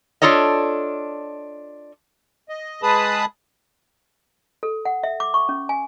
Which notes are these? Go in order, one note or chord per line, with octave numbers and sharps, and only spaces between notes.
D4 F4 A4 C#5 D#5
D#5
G#3 G#4 B4 A5 B5 D#6
A4
F#5
E5
D6
C#6
C#4
G#5